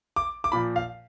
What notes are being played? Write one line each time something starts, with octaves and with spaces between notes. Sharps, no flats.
D6
D6
A#2 F3 B5
F5